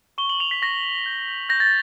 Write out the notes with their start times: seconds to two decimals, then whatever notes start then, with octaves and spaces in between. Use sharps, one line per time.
0.18 C#6 G7
0.30 F#7
0.40 C#6 F7
0.51 B6
0.62 C#6 A#6
0.84 C#6
1.06 G6
1.27 G6
1.49 G6 A#6
1.60 A6